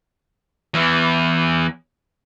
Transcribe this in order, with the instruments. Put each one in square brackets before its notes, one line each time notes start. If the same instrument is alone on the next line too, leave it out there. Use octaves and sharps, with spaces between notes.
[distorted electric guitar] E2 E3